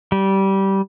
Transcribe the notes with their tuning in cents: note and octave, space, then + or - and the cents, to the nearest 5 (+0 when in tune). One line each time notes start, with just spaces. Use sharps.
G3 -15